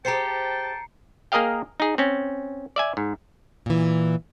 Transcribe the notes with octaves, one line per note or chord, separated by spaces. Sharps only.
G4 G#4 C5 G5 A5 A#5 C7 C#7
A#3 G#4 A#4 D#5 F5 G5
D#4 G#4
C4 C#4
D5 E5 G#5
G#2
A#2 E3